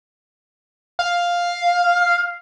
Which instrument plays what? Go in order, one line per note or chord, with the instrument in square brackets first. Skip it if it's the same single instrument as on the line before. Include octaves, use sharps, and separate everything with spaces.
[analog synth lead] F5